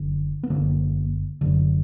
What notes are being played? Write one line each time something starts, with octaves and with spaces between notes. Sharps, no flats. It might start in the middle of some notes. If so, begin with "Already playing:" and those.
Already playing: F#1 F#2 D3
B3
F#1 F#2 D3 A#3
F#1 F#2 D3